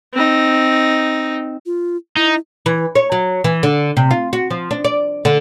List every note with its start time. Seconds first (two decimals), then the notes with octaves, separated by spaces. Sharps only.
0.13 C4 D#4
1.66 F4
2.16 D#4 E4
2.66 E3
2.95 C#5
3.12 F#3
3.44 E3
3.63 D3
3.97 C3
4.11 F4
4.33 F#4
4.50 F3
4.71 D4
4.84 D5
5.25 D3